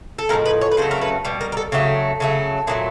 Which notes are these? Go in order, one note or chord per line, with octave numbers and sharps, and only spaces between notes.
A4
A2 F3 G#3 A#4
B4
C#5
B4
C#3 F#3 A3 C5
A#4
B4
B2 G3
A#4
A#4
A4
C#3 F#3 A3 G4
C#3 F#3 A3
A#2 F#3 A3 G#4